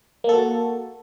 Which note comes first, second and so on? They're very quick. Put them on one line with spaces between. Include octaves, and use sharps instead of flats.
A#3 A4 F#4